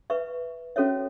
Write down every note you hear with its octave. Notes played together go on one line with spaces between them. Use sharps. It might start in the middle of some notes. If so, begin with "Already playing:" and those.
B4 E5 C#6
C#4 F#4 A4 C#5 E5